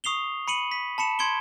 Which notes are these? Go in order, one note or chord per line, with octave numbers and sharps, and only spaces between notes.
C#6 D#6 C7 F7 G7
B5 C#7 D#7 F#7
B6
A5 B5 C#7 E7
C6 G#6 C#7 D7 G7